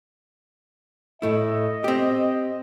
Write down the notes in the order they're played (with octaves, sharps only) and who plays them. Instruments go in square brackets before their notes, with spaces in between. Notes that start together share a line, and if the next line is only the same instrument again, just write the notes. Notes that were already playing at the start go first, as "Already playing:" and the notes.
[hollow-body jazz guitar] A2 A3 E4 [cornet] D#5
[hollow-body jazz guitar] C4 G4